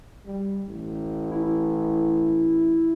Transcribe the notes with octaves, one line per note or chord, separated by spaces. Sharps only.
G3
A1
E4